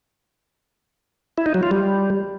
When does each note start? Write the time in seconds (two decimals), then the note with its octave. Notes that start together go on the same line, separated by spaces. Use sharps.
1.38 E4
1.46 D#4
1.54 F#3
1.63 F4
1.71 G3